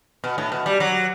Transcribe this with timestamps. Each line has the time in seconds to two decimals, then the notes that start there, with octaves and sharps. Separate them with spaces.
0.24 B2
0.38 A2
0.52 B2
0.66 G3
0.80 F#3